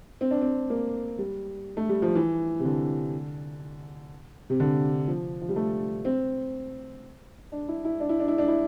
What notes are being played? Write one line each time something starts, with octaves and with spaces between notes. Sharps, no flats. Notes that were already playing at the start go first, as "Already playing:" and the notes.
C4
D4
C4
A#3
G3
A3
G3
F3
E3
C3
D3
C3
D3
F3
F3
G3
A3
C4
D4
E4
E4
D4
E4
D4
E4
D4
E4